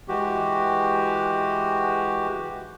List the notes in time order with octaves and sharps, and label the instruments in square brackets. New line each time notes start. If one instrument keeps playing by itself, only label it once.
[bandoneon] E3 G#3 F#4 G4